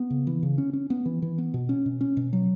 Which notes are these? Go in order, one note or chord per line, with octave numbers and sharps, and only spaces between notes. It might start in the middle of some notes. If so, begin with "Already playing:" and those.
Already playing: B3
C#3
E3
C#3
C#4
C#4
B3
E3
E3
B3
B2
C#4
B2
C#4
B2
F#3